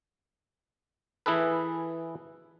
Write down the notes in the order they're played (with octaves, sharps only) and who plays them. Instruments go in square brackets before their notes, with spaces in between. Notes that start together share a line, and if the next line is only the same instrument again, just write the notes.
[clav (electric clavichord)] E3 E4 G#4 A4 B4